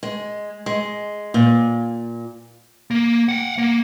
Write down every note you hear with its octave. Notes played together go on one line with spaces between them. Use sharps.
G#3
G#3
A#2
A#3
F5 F#5
A#3